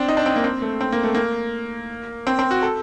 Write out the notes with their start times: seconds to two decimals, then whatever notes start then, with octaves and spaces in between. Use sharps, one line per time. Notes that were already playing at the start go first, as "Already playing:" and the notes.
Already playing: C4 D4
0.08 D#4
0.17 D4
0.26 C4
0.36 A#3
0.44 C4
0.62 A3
0.81 C4
0.92 A#3
1.03 A3
1.15 A#3
2.27 C4
2.39 C4
2.51 F#4
2.63 A4